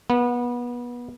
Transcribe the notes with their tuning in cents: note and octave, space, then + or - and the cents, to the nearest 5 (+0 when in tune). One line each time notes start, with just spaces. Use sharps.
B3 -25